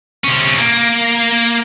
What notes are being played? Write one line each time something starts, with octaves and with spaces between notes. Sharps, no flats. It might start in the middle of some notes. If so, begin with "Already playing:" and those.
C3 C#4
A#3